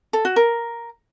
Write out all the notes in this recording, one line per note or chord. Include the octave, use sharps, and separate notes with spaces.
A4
F#4
A#4